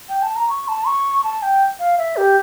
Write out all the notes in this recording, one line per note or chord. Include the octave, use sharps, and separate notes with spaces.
G5
A5
A#5
C#6
A5
C#6
A5
G5
F5
E5
G4